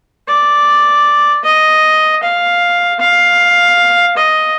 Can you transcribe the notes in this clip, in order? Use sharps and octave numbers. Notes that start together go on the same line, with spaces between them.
D5
D#5
F5
F5
D#5